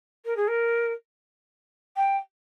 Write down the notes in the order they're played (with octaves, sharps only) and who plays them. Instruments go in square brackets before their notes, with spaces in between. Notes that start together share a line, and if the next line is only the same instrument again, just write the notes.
[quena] A#4
G#4
A#4
G5